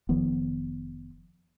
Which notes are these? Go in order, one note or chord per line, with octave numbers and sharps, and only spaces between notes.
F1 D#3 F3 B3